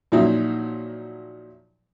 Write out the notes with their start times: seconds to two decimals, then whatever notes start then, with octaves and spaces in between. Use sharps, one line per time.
0.12 A#2 F3 F#3 D#4 E4